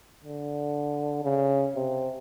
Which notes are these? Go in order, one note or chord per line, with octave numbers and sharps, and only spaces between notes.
D3
C#3
C3